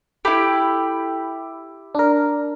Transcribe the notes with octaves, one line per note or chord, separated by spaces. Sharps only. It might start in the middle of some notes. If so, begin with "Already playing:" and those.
E4 G4 A4 G5 B5
D4 A#4